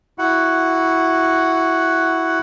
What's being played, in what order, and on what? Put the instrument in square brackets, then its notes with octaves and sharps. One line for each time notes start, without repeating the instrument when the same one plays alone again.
[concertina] E4 F#4 F#5